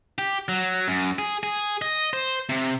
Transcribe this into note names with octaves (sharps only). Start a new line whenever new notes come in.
G4
F#3
F#2
G#4
G#4
D#5
C5
C3